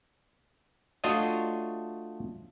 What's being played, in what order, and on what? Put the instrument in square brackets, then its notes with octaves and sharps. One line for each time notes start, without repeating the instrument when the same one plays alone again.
[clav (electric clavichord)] A3 D4 F4 F#4 C#5 D#5